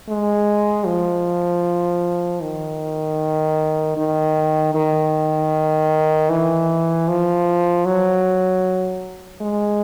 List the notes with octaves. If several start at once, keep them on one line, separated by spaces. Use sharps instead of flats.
G#3
F3
D#3
D#3
D#3
E3
F3
F#3
G#3